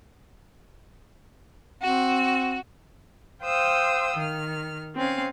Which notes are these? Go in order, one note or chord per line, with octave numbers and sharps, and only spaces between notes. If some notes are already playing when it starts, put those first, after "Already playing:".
C4 F#4
C5 F5 G5 D#6 E6
D#3 F6
C4 C#4 F5